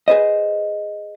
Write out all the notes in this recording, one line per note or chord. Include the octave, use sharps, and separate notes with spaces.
G#4 B4 C5 D#5